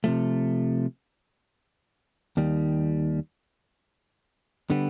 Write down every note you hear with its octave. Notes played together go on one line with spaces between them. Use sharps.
C3 F3 A3
D#2 D#3 G3
D3 G3 B3